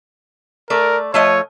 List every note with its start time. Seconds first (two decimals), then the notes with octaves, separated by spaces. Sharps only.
0.70 A3 A#4 D5
1.14 F3 A3 C#5 D#5